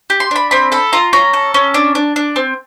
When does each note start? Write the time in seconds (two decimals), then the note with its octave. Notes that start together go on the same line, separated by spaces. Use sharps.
0.10 G4
0.20 C6
0.31 D4 B5
0.51 C4 B5
0.72 A4 B5
0.93 F4 A#5
1.13 C#4 A#5
1.33 A4
1.54 C#4
1.74 D4
1.95 D4
2.16 D4
2.36 C4